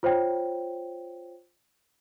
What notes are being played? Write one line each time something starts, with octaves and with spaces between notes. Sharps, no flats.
F4 C5 C#5 G5